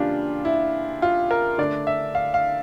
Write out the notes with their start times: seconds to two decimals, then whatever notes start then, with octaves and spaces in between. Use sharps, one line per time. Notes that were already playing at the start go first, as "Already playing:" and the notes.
Already playing: C#3 E3 G3 A#3 D4 F4 G4
0.45 E4
1.02 F4
1.31 A#4
1.58 D3 A3 D4 D5
1.87 E5
2.15 F5
2.34 F5